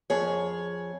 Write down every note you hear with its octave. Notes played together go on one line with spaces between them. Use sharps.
F2 G#4 C#5